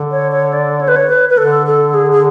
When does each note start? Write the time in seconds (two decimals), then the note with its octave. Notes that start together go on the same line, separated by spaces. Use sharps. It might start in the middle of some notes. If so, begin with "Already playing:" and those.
Already playing: D3
0.11 C#5
0.32 C#5
0.53 D5
0.81 C#5
0.88 B4
0.96 C#5
1.10 B4
1.30 B4
1.38 D3 A4
1.66 A4
1.94 G#4
2.12 G#4